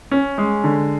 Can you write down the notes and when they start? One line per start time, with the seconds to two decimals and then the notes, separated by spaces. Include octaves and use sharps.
0.11 C#4
0.38 G#3
0.64 D3